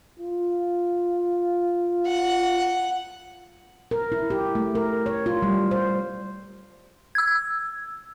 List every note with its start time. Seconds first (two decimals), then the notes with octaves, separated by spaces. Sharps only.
0.19 F4
2.07 F#5
3.91 A#4
4.12 E4
4.30 G4
4.55 A3
4.75 A#4
5.06 C#5
5.26 F4
5.42 G3
5.71 C5
7.15 E6 G#6